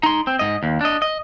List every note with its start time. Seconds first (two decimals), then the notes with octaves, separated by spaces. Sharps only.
0.03 D#4 C6
0.27 C4
0.39 G#2 D#5
0.63 D#2
0.81 D4 D#5
1.02 D#5